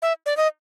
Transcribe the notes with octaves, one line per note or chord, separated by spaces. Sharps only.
E5
D5
D#5